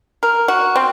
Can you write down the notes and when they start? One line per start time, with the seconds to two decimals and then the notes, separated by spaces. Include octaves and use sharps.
0.23 A#4
0.48 F#4
0.76 C4